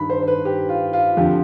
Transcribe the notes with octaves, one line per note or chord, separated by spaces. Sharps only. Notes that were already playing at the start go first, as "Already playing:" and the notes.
Already playing: G2 D#3 B5
C5
C5
B4
G4
F4
F4
F2 D3 F3 G4